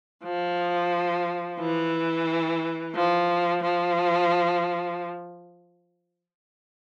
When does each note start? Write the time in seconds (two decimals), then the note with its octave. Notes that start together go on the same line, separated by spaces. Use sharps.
0.24 F3
1.59 E3
2.95 F3
3.63 F3